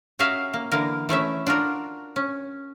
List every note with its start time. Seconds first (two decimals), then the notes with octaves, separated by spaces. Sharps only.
0.19 C#4 F#4 G#4 A#4 E5 F5
0.54 A#3
0.72 D3 E3 A#3 A#4
1.09 E3 A3 C#4 E5
1.47 D4 F4 F#4 A#4
2.16 C#4